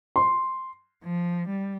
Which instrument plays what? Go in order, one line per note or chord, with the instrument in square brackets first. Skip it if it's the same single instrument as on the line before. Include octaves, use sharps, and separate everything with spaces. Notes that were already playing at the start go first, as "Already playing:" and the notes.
[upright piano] C6
[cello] F3
G3